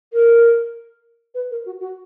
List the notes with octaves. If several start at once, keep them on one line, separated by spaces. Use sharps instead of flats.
A#4
B4
A#4
F#4
F#4